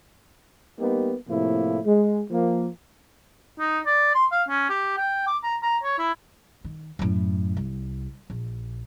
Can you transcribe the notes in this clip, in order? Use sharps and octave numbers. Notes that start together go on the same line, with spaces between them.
G3 A#3 B3 D#4 G4
A2 C3 F3 A#3 E4
G#3
F3 A#3
D#4
D5
C6
F5
C#4
G4
G5
D6
A#5
A#5
C#5
E4
D#3
F#2 A2
C2
A#1